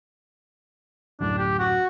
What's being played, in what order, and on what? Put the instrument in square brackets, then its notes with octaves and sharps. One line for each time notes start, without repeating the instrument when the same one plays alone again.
[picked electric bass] D1 F#2 A2 [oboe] D4
[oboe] G4
F#4